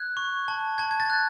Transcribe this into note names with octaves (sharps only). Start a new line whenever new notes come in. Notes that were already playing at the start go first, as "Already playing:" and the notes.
Already playing: F#6 G#6
C#6
A5
A5 G#6
G#6
A6
F#6